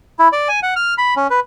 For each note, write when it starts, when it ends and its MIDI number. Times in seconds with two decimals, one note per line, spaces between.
0.19 0.28 64
0.32 0.48 74
0.48 0.60 80
0.63 0.74 78
0.76 0.94 89
0.98 1.14 83
1.16 1.27 61
1.30 1.40 71